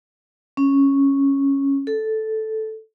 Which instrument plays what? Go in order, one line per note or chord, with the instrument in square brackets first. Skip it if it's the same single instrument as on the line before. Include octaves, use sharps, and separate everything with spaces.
[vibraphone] C#4
A4